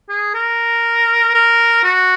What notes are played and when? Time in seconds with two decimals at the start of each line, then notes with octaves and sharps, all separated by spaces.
0.09 G#4
0.34 A#4
1.34 A#4
1.84 F#4